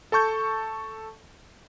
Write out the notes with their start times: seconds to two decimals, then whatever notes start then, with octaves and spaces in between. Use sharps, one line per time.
0.12 A4 A5 C#6 G6